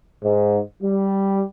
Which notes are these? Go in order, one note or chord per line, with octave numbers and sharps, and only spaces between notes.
G#2
G3